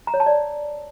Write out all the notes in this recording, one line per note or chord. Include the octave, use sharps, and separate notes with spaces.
A#5
C#5
A5
D5